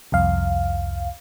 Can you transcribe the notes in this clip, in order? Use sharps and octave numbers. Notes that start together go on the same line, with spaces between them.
C2 F2 F5